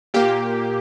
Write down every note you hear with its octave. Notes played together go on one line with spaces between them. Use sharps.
A#2 A#3 G4